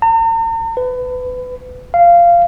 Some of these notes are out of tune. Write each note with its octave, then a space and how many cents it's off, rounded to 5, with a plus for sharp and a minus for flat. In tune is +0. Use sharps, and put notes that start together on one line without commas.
A#5 -45
B4 +25
F5 -15